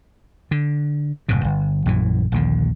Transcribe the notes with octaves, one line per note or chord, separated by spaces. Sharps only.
D3
F1 G#2 B2
G1
A#1 F#2 E3
A#1 D#2 D3